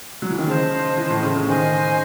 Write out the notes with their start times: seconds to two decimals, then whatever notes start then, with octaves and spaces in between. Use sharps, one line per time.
0.22 F#3
0.30 E3
0.38 D#3
0.47 C#3 C5 D#5 A5
0.97 E3
1.10 A2
1.22 C#3
1.35 C#3
1.47 D#3 C5 D#5 G#5